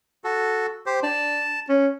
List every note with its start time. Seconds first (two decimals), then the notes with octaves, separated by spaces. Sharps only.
0.24 F#4 A4
0.86 G4 C5
1.03 D4 A5
1.69 C#4